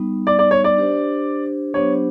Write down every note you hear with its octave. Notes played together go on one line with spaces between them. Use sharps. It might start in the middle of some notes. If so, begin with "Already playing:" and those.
Already playing: G3 B3 D#4
D5
D5
C#5
D5
D4 G4 C5
F#3 B3 D4 G4 C5 C#5